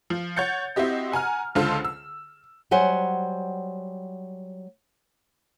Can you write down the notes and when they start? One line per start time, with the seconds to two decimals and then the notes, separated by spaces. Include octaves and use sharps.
0.10 F3
0.36 C#5 F#5 G6 A6 C#7
0.76 C4 E4 F#4 G4 D#5
1.12 F#5 G#5 A#5 F6
1.55 C#2 D3 F4 A4 C5 A5
1.85 E6
2.71 F#3 G3 C5 F#5 G#5